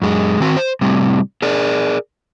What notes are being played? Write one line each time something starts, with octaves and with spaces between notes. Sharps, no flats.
F#2 G#3
D#3 C4 F#4
C5
A2 C3 G3
G#4 A#4 D5